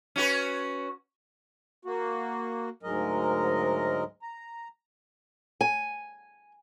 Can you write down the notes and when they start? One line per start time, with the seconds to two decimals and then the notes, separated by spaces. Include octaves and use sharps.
0.16 C#4 F#4 B4
1.85 A#3 F#4
2.83 D2 G#2 F#3 G#3 A#4 D#5
4.22 A#5
5.61 G#5